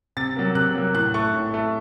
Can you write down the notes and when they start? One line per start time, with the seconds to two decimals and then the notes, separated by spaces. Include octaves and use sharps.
0.17 C3 A6
0.36 F#3 A#3
0.55 C3 F#6
0.75 F#3 A#3
0.95 A2 F#6
1.14 A3 C#6
1.34 A2
1.54 A3